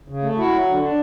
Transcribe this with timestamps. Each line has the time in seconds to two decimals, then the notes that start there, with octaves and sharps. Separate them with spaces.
0.08 C#3
0.23 A3
0.38 E4 F#4
0.53 F#3
0.66 D3
0.82 D4